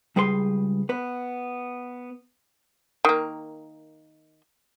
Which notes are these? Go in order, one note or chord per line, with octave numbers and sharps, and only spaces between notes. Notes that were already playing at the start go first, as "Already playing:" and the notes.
C#2 G3 G#4 B4 C5 C6
B3 B4
D#3 A#3